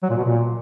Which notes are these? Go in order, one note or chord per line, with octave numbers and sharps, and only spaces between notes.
F#3
A#2
B2
A#2